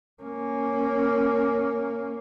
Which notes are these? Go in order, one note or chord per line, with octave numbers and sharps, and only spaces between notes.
A#3 C#4